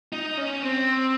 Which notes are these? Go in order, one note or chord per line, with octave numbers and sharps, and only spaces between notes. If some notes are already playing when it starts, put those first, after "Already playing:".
D#4
C#4
C4